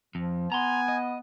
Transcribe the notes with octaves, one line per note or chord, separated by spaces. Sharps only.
F2 F3
B3 G#5 A#5 C6
D#5